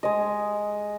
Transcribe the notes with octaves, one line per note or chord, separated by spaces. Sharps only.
G#3 D#5